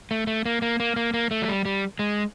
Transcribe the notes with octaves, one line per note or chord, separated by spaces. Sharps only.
A3
A3
A#3
A#3
A#3
A#3
A#3
A3
F#3
G3
G3
G#3